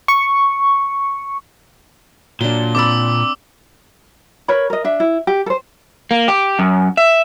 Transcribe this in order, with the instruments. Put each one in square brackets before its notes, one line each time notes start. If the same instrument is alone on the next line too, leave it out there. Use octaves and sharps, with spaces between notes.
[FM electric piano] C#6
[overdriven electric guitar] A#2 [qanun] F#3 D4 [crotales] G7
[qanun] C4 D5 B5 [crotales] D6 E6
[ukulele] A#4 B4 C#5 B5
A#4 D#5
D4 E5
E4
G4
A4 C5
[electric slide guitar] A#3
G4
F#2
E5